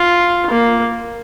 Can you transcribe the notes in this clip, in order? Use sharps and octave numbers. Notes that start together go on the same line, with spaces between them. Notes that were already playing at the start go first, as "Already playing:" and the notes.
Already playing: F4
A#3